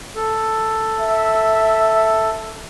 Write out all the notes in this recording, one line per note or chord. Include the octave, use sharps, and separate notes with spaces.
A4
E5